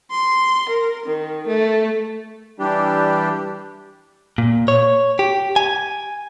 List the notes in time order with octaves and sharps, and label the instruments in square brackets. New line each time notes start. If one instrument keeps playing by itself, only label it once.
[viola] C6
A#4
D#3
A3
[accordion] E3 G3 D4 G4
[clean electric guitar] A#2
C#5
G4
G#5